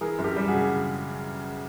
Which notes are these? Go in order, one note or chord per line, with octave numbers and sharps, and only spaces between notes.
E3 G#4 A#4
F#2 A#4
G4 A4
G3
F#4 G#4
C#3